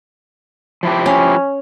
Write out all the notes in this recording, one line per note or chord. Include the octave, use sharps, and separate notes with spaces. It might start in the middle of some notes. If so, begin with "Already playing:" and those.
F3 E4 G4
C#4